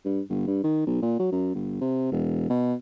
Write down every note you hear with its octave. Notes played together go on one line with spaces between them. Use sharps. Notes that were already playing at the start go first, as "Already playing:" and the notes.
G2
G1
G2
D#3
B1
A#2
F#3
F#2
G1
C3
E1
B2